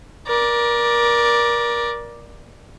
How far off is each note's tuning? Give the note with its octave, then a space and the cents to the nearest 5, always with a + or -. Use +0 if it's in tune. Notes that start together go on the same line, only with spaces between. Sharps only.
A#4 +25 D5 +0